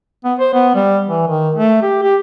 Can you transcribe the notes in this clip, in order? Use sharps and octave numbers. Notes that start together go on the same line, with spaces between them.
B3
C5
B3
G3
E3
D#3
A3
G4
G4